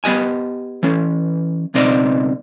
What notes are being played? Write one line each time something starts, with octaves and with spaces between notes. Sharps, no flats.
B3 G4 D#5 G#5
E3 C#4
C#2 B2 C4 D#4 D5 D#5